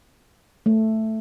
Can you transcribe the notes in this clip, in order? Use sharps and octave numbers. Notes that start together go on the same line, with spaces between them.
A3